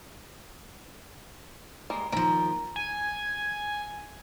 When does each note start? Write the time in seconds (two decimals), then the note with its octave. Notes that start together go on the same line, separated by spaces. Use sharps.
1.90 G3 G#3 A#3
2.12 D#2 F3 A#4 A#5 B5
2.76 G#5